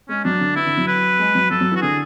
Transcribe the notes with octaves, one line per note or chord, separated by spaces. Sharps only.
G#3 C#4
F#3 D4
D3
E3 E4
D3
F#3
B4
G#3
F#3
F#3 A4
F#3
E3 F#4
D3 G#4